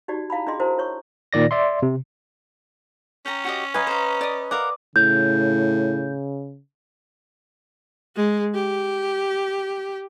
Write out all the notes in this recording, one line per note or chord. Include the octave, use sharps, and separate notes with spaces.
D#4 F#4 G4 D5
E4 F5 A5 B5
D4 F4 G#4 D#5 C6
E4 F#4 A#4 C5 A5
E4 C#5 C#6
A#2 D#3 D5 A#6
D5 E5 C6
C3
C#4 G5 A#5
F#4 G4 D#5
B4 D#5 F5 G#5 A#5
C5 F5
D5 D#6
A#4 D5 F5 F#5
A2 C#3 G6
G#3
G4